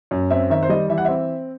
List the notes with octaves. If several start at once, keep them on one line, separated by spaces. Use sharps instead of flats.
F#2
C4 E5
D#3 E5
C5
G3 D#5
E3 E5
F#5
C4 E5